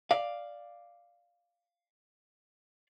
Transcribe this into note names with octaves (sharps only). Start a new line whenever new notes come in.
D5 F5